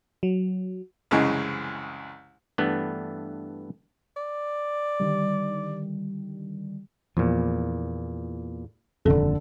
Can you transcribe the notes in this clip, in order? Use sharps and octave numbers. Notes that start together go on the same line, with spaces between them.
F#3
C2 F#2 C#3 E3 G#3
G2 E3 A3 B3 D4
D5
D3 D#3 G3
E2 A#2 F3
D#1 F2 D3 A4